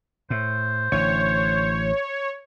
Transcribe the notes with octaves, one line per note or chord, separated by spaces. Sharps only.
A2 C5
A1 D3 C#5